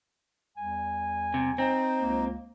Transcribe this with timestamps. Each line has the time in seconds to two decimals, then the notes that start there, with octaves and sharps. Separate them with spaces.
0.57 E2 G3 G#5
1.34 C3
1.58 C4 D#4
2.00 C#2 A#3